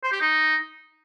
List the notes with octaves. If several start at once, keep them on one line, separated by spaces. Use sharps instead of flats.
C5
G4
D#4